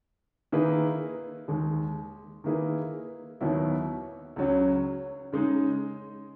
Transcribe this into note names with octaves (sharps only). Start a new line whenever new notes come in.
D#3 A#3 E4 G#4 B4
D#2 D#3 G#3
D#3 A#3 E4 G#4 B4
D#2 D#3 F#3 B3 E4
C#2 C#3 F#3 C#4
C#3 G#3 D#4